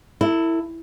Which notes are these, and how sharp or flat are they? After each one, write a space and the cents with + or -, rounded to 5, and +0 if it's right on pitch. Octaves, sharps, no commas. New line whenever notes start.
E4 +0 A4 +40